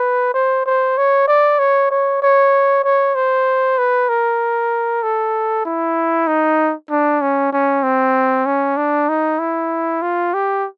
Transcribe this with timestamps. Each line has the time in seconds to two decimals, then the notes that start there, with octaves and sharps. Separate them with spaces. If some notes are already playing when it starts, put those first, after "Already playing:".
Already playing: B4
0.34 C5
0.66 C5
0.97 C#5
1.27 D5
1.59 C#5
1.90 C#5
2.22 C#5
2.84 C#5
3.15 C5
3.78 B4
4.09 A#4
5.03 A4
5.65 E4
6.27 D#4
6.90 D4
7.21 C#4
7.52 C#4
7.83 C4
8.46 C#4
8.77 D4
9.09 D#4
9.39 E4
10.02 F4
10.34 G4